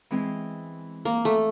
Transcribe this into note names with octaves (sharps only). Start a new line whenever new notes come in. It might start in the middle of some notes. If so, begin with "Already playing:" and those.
E3 G#3 C4
A#3
A3